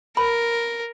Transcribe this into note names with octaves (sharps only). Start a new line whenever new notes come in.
A#4 B5